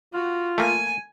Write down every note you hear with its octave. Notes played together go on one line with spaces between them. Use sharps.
F4 F#4
A3 A#3 G#5